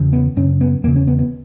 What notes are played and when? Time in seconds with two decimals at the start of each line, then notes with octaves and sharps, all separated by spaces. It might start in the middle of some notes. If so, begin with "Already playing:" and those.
Already playing: E2 C#3
0.13 B3
0.36 F#2 C#3 C#4
0.61 B3
0.84 E2 A#3
0.87 C#3
0.96 C#4
1.07 B3
1.19 B3